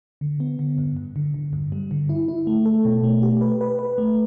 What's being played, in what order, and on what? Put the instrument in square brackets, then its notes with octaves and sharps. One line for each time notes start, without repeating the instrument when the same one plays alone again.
[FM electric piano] D3
B3
D3
G2
G2
D3
D3
G2
G3
D3
E4
E4
A3
A4
B2
A3
G4
B4
B4
B4
A3